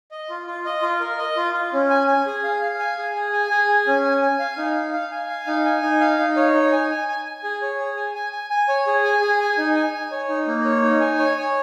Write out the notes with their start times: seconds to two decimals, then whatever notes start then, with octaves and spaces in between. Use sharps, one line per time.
0.11 D#5
0.30 F4
0.47 F4
0.65 D#5
0.82 F4
1.00 A#4
1.18 D#5
1.37 F4
1.54 F4
1.73 C#4
1.90 G#5
2.07 G#5
2.26 G#4
2.44 F5
2.62 F5
2.79 G#5
2.97 G#4
3.15 G#4
3.33 G#5
3.50 G#4
3.69 G#5
3.87 C#4
4.05 G#5
4.22 G#5
4.39 F5
4.58 D#4
4.75 F5
4.93 F5
5.11 G#5
5.29 F5
5.47 D#4
5.65 G#5
5.82 D#4
6.01 F5
6.18 D#4
6.36 C#5
6.54 D#4
6.72 G#5
6.90 G#5
7.08 G#5
7.25 G#5
7.44 G#4
7.62 C#5
7.79 G#4
7.97 G#5
8.15 G#5
8.33 G#5
8.50 G#5
8.68 C#5
8.87 G#4
9.04 G#5
9.21 G#4
9.40 G#5
9.58 D#4
9.76 G#5
9.93 G#5
10.11 C#5
10.29 D#4
10.47 A#3
10.65 C#5
10.82 D#4
11.00 G#5
11.18 C#5
11.36 C#5